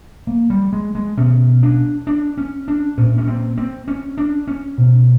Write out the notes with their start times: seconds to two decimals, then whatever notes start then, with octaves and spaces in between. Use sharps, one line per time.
0.27 A#3
0.50 G3
0.73 G#3
0.95 G#3
1.17 B2 C#4
1.63 D4
2.07 D4
2.38 C#4
2.68 D4
2.97 A#2 C#4
3.18 C#4
3.28 C4
3.58 C4
3.88 C#4
4.18 D4
4.48 C#4
4.78 B2